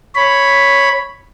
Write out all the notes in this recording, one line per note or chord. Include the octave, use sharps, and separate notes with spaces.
C#5 B5